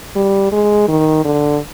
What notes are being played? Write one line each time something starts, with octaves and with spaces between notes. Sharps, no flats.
G3
G#3
D#3
D3